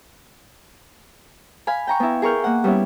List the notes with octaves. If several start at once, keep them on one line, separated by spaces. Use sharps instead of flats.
F5 G#5 B5
G5 A#5 C#6
B3 E4
G#4 A#4 C#6 F6 G6
A#3 F#5
G3 B3 C#4 E4